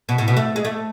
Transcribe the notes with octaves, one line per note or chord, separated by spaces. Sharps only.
B2
A2
B2
A3
G#3
A3